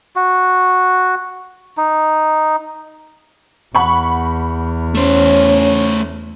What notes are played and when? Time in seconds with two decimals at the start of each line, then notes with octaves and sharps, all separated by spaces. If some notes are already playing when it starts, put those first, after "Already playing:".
0.16 F#4
1.77 D#4
3.75 E2 F#5 B5 C#6
4.95 A3 C#4 C5